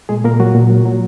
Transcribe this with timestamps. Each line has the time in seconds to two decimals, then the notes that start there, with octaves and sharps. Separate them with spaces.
0.09 A#2 G#3 G#4
0.24 A#2 A#3 A#4
0.40 F#3 F#4
0.55 A#2
0.70 F#3
0.86 F#3